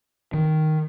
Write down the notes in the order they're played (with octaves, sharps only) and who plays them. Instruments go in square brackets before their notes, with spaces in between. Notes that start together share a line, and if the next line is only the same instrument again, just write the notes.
[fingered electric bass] D#3